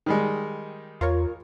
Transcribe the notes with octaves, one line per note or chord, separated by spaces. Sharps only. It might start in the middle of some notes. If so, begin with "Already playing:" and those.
D#3 G3 G#3
E2 F4 A#4 C#5